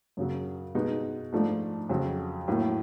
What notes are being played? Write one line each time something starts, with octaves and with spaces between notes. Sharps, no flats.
F#2 C#3 F#3
B2 G#3 B3 D#4
G#2 F3 A3 D4
F2 C#3 F#3
A2 F#3 A#3